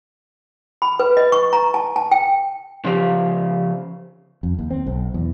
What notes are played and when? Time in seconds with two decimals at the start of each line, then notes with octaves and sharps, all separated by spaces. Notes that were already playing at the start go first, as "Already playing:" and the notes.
0.82 B5
1.00 B4
1.17 D#5
1.32 C#6
1.53 A#5
1.74 A5
1.96 A5
2.12 G5
2.84 C#3 F3 G4 F5
4.43 F2
4.59 D#2
4.71 C4
4.86 B1
5.14 E2